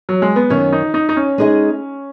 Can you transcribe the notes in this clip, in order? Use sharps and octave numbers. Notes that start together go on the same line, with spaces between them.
F#3
G#3
B3
F#2 D#3 F#3 C#4
D#4
D#4
D#4
C#4
G#3 D#4 G#4 D#5